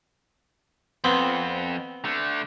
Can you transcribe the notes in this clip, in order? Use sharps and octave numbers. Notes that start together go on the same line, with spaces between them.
F2 B3 C4
D3 A3